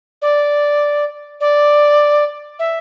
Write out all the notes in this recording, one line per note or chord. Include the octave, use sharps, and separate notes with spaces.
D5
D5
E5